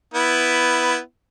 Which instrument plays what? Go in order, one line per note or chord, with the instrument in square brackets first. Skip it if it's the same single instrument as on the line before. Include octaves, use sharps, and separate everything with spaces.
[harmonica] B3 E4